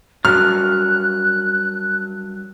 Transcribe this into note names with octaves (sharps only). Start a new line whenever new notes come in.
G2 F#3 F6 F#6